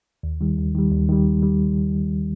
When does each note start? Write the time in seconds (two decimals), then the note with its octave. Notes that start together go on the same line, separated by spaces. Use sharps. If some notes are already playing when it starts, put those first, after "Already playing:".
0.23 D#2
0.41 D#3 G3
0.58 D#2
0.75 D#3 G3
0.91 D#2
1.09 D#3 G3
1.25 D#2
1.42 D#3 G3